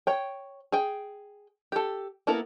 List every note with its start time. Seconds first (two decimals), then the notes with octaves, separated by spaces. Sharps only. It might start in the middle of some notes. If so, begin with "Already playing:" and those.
0.07 C#5 G5
0.72 G#4 G5
1.72 G4 A4
2.27 A#3 B3 E4 A4 A#4